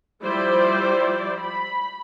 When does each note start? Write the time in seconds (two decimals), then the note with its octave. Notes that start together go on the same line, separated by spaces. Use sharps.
0.24 F3 G3 E4 C5 D5
1.37 B5